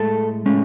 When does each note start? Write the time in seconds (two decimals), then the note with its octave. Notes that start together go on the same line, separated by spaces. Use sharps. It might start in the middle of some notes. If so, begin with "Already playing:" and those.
Already playing: A2 G#3 A4
0.46 A2 G#3 C#4